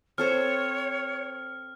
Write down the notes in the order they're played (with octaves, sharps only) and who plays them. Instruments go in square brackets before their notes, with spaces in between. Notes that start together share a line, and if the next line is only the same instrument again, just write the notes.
[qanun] C4 A4 C5 [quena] C#5 [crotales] F6